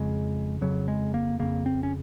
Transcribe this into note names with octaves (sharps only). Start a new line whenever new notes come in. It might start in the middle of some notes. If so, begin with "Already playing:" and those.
Already playing: F2 C#3 G#3
F2 C#3 F#3
G#3
A#3
F2 C#3 A#3
C4
C#4